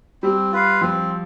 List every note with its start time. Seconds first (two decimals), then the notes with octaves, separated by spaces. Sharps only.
0.23 G3 C4
0.52 F4 B4 F5
0.81 F3 C4